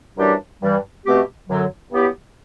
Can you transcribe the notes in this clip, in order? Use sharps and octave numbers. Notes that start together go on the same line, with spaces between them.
F#2 E3 G3 D4 G4
G2 E3 G3
B2 A3 C4 G4
F#2 D3 F#3
G2 F#3 B3 E4 G4